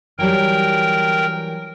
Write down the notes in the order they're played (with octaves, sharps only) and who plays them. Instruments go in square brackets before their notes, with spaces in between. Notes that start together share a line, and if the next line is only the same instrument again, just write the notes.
[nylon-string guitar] E3 F#3 G3 [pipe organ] A#4 G5